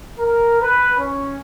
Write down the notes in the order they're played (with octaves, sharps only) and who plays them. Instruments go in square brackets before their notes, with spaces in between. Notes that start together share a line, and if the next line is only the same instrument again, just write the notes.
[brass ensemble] A#4
B4
C#4